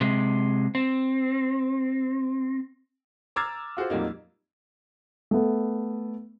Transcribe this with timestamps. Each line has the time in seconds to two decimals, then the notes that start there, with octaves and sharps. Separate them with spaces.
0.01 C3 G#3
0.75 C4
3.36 A#5 D6 E6 F6 G#6 A6
3.77 F4 F#4 G#4 C5
3.90 F2 F#3 G3 A#3 D#4
5.31 A3 B3